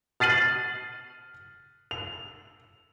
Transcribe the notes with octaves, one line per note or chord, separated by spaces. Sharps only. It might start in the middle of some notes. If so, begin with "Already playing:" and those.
F6 A6 C7 D#7 F#7
F7